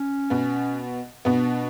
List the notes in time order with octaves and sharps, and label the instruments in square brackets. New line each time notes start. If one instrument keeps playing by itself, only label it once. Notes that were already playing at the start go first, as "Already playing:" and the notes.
Already playing: [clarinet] C#4
[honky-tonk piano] B2 B3
[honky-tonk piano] B2 B3 [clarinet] D4